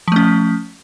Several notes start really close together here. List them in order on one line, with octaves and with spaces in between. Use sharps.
F3 A3 C#4